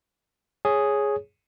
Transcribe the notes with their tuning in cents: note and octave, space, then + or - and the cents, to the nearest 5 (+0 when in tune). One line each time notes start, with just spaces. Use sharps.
G#4 +0 C#5 +0